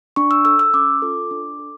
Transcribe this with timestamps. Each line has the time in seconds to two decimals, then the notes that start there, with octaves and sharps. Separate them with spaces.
0.16 D4 C#6
0.31 E6
0.45 A4 E6
0.59 E6
0.74 C#4 D6
1.02 F4 A4
1.31 D4
1.59 A4